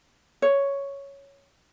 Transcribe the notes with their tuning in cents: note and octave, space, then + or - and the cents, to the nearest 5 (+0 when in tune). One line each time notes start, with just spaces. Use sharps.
C#5 +5